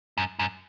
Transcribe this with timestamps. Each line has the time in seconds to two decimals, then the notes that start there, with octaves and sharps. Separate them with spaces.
0.18 F#2
0.39 F#2